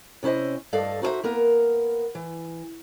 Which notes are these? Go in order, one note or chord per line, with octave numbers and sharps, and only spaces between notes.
C3 C#4 E4 C5 D#5
G2 A4 D5 D#5 F5
D#4 F#4 A4 C5 E5
A#3 B3 A#4
E3